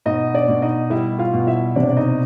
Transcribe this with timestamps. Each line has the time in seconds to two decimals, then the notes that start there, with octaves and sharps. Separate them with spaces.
0.06 B2 D#4 D#5
0.34 D4 D5
0.48 B2
0.62 D#4 D#5
0.90 G3 E4 E5
1.18 F4 F5
1.33 B2
1.47 E4 E5
1.75 C3 D4 D5
1.90 D5
1.97 D#4 D#5